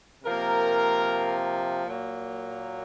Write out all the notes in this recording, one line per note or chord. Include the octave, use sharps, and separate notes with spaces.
C3 F3 A#3 A#4
A#2 F#3 A#3